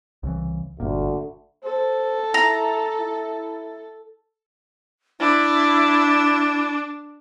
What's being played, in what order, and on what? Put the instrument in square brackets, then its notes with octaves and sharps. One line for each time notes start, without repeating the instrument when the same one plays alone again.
[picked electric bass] C2 C#3 E3
[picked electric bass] G1 A#2 [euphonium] D2
[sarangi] A4 [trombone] C5
[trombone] E4 [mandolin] A#5
[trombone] E4
[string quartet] D4 [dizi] E4